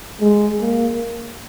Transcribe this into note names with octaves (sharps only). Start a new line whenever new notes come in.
G#3
A#3